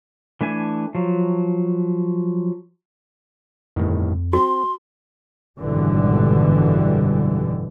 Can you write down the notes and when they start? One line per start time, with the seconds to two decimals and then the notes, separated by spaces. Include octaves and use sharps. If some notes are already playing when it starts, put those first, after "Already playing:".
0.41 E3 A3 D4 G#5
0.95 F3 F#3
3.76 G1 F2 A2 D#3
4.33 C4 F#4 C6
5.58 G#1 F#2 B2 D3 E3 G3